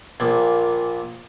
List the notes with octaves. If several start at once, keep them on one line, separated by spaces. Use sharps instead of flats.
A#1 A#2